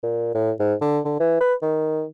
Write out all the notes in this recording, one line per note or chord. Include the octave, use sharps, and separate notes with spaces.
A#2
A2
G#2
D3
D3
E3
B4
D#3